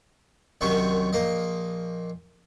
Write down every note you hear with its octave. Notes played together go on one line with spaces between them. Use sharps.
C2 F#2 C3 D#3 F#3 C#6
A#1 A#3 D#5